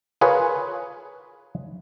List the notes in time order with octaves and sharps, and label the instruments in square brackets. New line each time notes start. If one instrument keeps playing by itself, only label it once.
[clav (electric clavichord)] F4 G#4 A#4 B4 C#5